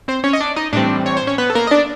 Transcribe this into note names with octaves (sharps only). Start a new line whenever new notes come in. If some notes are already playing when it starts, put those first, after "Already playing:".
C4 C5
C#4 C#5
D#5
D4 D5
D#4 D#5
A2 E3 G3 C4 D4 D5
C#5
C5
C#4 C#5
B3 B4
A4
A#3 A#4
D#5
D4 D5